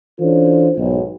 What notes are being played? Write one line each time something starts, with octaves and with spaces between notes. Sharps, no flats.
E3 C#4 D4 F4 A4 C5
B1 G#2